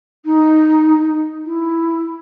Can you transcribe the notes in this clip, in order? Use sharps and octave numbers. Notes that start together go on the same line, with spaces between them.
D#4
E4